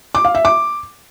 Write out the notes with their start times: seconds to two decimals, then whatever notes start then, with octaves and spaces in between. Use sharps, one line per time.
0.15 D6
0.25 F5
0.35 E5
0.45 D6